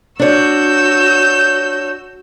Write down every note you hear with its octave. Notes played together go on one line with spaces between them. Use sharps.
D4 F#4 C#5 E6 G6